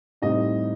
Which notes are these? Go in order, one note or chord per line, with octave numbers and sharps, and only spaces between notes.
A2 G3 C4 D#4 D#5